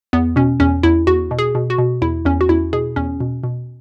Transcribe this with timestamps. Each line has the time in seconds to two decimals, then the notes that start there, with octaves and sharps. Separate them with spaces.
0.13 E2 B3
0.36 B2 C#4
0.60 E2 C#4
0.83 E2 E4
1.07 E2 F#4
1.31 B2
1.39 G#4
1.55 B2
1.70 F#4
1.79 B2
2.02 E2 E4
2.25 E2 C#4
2.41 F#4
2.49 E2 E4
2.73 B2 G#4
2.96 E2 C#4
3.21 B2
3.44 B2